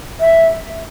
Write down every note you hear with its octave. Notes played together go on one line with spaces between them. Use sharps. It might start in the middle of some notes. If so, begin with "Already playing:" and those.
E5